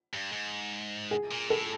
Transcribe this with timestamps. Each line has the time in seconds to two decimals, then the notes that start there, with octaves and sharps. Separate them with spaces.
0.14 G2
0.32 G#2
1.11 G#4
1.31 A#2
1.50 A2 A4